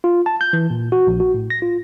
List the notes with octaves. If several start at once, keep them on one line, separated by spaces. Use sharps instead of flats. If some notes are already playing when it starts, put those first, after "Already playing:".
F4
A5
G6
E3
A#2
F#4
A#1
F#4
A2
A#6
F4